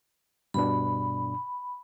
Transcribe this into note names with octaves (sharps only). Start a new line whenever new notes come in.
G2 B2 D4 B5